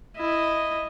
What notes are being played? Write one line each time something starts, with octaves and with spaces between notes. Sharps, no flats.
E4 D#5